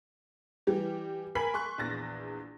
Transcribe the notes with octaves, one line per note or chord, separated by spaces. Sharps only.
E3 G3 G4
A#4 G#5 B5 B6 F#7
C6 C#6 F#6
A#1 E2 A6 A#6